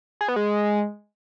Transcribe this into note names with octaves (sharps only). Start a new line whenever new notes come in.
G#4
B3
G#3